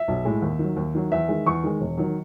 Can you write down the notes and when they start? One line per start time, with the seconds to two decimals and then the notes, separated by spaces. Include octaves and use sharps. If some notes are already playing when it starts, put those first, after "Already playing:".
Already playing: E5
0.08 B1
0.25 A2 G#3
0.42 D#2
0.59 D#3 F#3
0.76 D#2
0.95 D#3 F#3
1.12 E2 E5
1.28 D#3 G#3
1.46 E2 C#6
1.64 D#3 G#3
1.81 E1
1.98 D#3 F#3